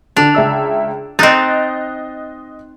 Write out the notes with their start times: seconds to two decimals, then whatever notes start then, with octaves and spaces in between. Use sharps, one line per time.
0.17 D3 D4 F7
0.35 C#2 E5 E6
1.19 C4 D#4 D#5 F#6 A6